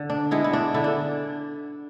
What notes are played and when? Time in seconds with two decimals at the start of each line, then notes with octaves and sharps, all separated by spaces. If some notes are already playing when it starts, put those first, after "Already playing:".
Already playing: D3
0.10 D4
0.31 G#3 B3 E4
0.44 E4
0.53 D4
0.74 D3 E4
0.84 D4